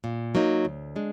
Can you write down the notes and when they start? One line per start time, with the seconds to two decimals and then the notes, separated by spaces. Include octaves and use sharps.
0.04 A#2
0.35 F#3 A#3 D#4
0.65 D2
0.96 G#3 D4